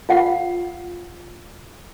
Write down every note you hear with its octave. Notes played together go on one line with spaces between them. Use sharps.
F4 F5 F#5